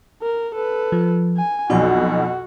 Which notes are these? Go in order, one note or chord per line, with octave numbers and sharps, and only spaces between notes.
A#4
A4 B4
F3
G#5
B1 F2 B2 D#4 F#4 D5 G#5